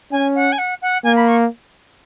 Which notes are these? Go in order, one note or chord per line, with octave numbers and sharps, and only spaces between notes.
C#4 G#5
F#5
G#5
F#5
F#5
A#3 G#5
B5
C#6